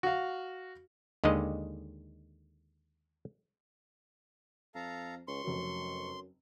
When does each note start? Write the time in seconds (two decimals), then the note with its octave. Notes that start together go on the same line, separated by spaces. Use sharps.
0.03 F#4 F5
1.24 D#2 D3 D#3 G#3 D#5
4.75 F2 A4 F5 A#5
5.28 C#2 C6 C#6
5.44 F1 F#2 F#3